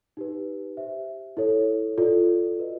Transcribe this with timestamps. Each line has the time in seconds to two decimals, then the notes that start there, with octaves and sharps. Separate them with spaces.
0.17 D#4 G4 B4
0.77 G4 C5 E5
1.37 E4 A4 C#5
1.98 F4 A4 D5
2.58 F#4 B4 D#5